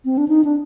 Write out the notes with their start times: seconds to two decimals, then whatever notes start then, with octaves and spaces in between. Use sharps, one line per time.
0.05 C4
0.18 D4
0.28 D#4
0.44 D4